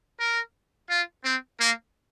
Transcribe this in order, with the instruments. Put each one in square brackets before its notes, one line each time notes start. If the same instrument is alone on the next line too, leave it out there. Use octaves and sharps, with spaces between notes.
[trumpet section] A#4
F4
C4
A#3